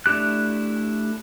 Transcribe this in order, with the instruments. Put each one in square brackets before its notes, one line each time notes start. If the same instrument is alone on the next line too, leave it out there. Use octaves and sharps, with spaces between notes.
[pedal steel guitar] A3 D4 E4 G4 F#6